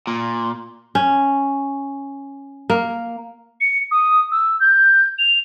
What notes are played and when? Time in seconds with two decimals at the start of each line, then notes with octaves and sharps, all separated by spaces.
0.07 A#2
0.95 C#4
2.70 A#3
3.60 C#7
3.91 D#6
4.31 E6
4.60 G6
5.18 F7